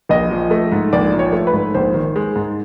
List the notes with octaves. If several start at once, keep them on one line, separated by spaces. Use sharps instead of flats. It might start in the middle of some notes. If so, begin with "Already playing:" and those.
A#1 D#5
F3
A3
G#2
A#1 D5
F3
C#5
A3
B4
G#2
A#1 C5
D#3
G#3
G#2